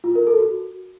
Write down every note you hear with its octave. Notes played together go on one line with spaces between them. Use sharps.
F4
A#4
A4
F#4